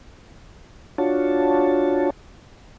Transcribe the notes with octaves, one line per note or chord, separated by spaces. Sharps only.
D4 F4 F#4 C#5 A5